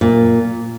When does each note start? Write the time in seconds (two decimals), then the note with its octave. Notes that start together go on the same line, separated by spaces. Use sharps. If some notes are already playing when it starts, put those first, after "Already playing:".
0.01 A#2